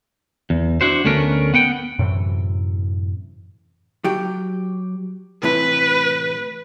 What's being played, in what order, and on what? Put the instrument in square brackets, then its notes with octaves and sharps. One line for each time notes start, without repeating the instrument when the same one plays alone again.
[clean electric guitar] E2
D4 E4 F#4 C5
D2 A3 B3 C#4 A#4
B3 F#5 G5
[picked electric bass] F#2 A2 C3 E3
[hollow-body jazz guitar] F#3 G4
[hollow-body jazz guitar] A2 C3 E3 [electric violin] B4